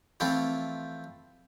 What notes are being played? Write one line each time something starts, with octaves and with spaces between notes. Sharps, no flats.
E3 F3 A3 C4